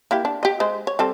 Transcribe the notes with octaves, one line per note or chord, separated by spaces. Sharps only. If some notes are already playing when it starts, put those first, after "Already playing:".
A#3 E4 G4
D4
G4 D#5
G#3 C5
C#5
G3 C4 A4